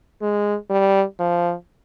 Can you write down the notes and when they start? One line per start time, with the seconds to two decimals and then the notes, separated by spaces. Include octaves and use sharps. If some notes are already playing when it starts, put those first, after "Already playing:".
0.22 G#3
0.70 G3
1.19 F3